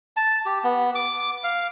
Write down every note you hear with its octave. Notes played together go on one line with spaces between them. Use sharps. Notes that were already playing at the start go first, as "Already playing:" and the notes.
A5
G4
B3
D6
F5